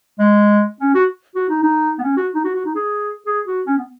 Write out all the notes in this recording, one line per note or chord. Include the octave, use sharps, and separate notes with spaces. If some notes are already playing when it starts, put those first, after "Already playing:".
G#3
C#4
F#4
F#4
D#4
D#4
B3
C#4
F#4
D#4
F#4
F#4
D#4
G#4
G#4
F#4
C#4
B3